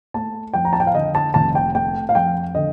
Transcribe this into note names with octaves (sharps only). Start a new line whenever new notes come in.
A3 A5
F2 G5
A#5
A5
G5
F5
D3 D#5
A5
F1 A5
G5
A3 G5
F5
F2 G5
D3 D#5